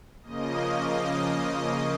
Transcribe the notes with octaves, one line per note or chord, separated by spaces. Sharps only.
C#3 F3 A#3 D#5